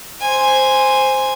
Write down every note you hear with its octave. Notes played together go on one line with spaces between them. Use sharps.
C5 G#5